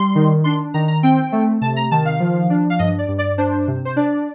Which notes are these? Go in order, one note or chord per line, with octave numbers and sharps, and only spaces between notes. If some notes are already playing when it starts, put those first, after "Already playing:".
Already playing: G3 C6
D#3
D4 C6
D#3 A#5
A#5
C4 G5
A3
C3 A5
A#5
D#3 A5
F5
F3
D4
F5
G2 D#5
D5
G2
D5
D4 C5
C3
C5
D4 D5